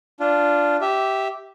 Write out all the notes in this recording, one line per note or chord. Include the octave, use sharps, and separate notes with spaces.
D4 F4
G4 E5